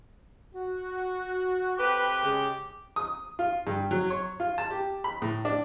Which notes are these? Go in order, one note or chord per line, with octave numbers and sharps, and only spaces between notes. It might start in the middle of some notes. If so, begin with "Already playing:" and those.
F#4
C4 G4 A4 B4
C#3 G#3
D#6
F4
G2
F#3
C#5
F4
A5
G4
B5
A2
D4